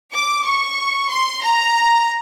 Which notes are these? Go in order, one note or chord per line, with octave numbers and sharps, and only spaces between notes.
D6
C#6
C6
A#5